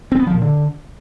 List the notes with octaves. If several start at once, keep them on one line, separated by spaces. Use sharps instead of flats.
C4
B3
F3
A#2
D3